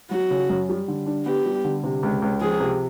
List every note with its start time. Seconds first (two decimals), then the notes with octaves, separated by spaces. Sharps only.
0.11 F#3 F#4
0.30 C#3
0.49 F#2
0.69 G3
0.88 D3
1.06 D4
1.26 B3 G4
1.45 G3
1.64 D3
1.83 C3
2.03 C#2
2.22 C#2
2.41 F3 G#4
2.60 C3